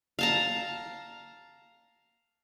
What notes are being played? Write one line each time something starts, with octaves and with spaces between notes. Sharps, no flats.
F5 A5 A#5